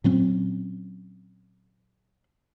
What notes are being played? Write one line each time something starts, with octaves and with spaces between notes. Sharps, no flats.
A#2 F#3 C4 C#4